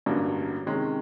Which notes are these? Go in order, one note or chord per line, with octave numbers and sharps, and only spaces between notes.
A1 G2 D3 F#3 A#3
C3 D#3 G#3 C#4